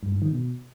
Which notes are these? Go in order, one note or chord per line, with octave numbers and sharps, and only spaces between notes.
G2
G#2
D#3
B2